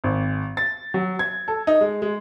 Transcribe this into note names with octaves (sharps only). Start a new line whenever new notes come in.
G#1
A6
F#3
G#6
A4
D#4
G#3
G#3